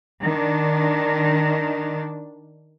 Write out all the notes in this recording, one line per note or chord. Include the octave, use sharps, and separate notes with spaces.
D#3 D4